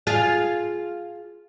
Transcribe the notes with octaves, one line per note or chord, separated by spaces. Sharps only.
F4 G#4 F5